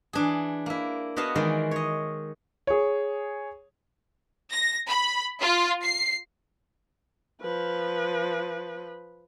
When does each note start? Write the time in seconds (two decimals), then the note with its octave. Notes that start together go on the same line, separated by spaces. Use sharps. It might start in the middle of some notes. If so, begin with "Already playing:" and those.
0.13 E3 D4 G#4
0.66 A#3 E4
1.16 B3 F#4 C#5 D#5 F5 A5
1.35 D#3 E3 G#3 A#4 D5
1.71 C#5 D#5
2.67 G#4 C#5
4.51 A#6
4.88 B5
5.41 F4
5.83 C7
7.41 F3 B4